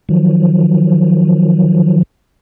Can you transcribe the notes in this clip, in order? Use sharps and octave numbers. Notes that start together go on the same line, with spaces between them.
D#3 F3 F#3